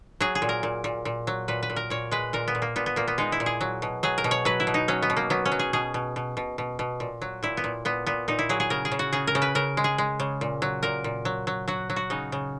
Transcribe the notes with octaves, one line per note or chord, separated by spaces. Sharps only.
F#3 G#4
G#4
A#2
A#4
A#2
A#2
A#2
F#3
A#2 B4
B4
A#2
A#4
A#2 C#5
G#3 B4
A#2 A#4
B3
A#2
A#3
A#2 B3
B3
A#2 A#3
B3
G#3 D#4
E4
A#2
G#4
F#3
B2
F#3 G#4
A#4
B2
C#5
F#3 B4
E4
B2
D#4
F#3 C#4
B3
B2
A#3
F#3 B3
C#4
F#3
G#4
B2 G#4
B2
B2
B2
B2
B2
A#2
F#3
A#2 E4
B3
A#2
A#2 B3
A#2 B3
A#2 D#4
E4
F#3 G#4
G#4
C#3 A#4
G#4
C#3
F#4
C#3 G#4
A#4
C#3
B4
C#3 A#4
G#3
G#4
G#3
C#3
A#2
F#3
A#2 A#4
A#2
F#3
F#3
F#3 F#4
F#3
F#4
C#3 D#4
C#3